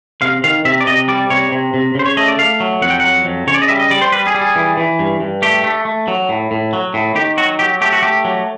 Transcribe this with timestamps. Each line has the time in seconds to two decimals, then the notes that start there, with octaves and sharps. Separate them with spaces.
0.22 C3 F5
0.44 D#3 F5
0.65 C3 E5
0.81 D5
0.87 C3 D#5
1.08 G3 D5
1.30 C3 C#5
1.52 C3
1.74 C3
1.95 C#3 C5
2.06 C#5
2.17 A3 D#5
2.28 D5
2.39 A3 F5
2.60 F#3
2.82 F2 F#5
2.90 G5
3.00 F#3 F#5
3.25 F2
3.47 C#3 C#5
3.54 D5
3.62 D#5
3.68 G3 E5
3.79 D#5
3.91 G3 D5
4.02 C5
4.12 G3 B4
4.27 G#4
4.35 G3
4.41 G#4
4.56 E3
4.77 E3
4.99 G2
5.20 G2
5.42 A3 G4
5.64 A3
5.85 A3
6.08 F#3
6.29 A2
6.51 A2
6.73 F#3
6.94 A2
7.15 D#3 G4
7.37 F#3 F#4
7.59 F#3 G4
7.81 A3 G4
7.93 F#4
8.02 A3 G4
8.25 F#3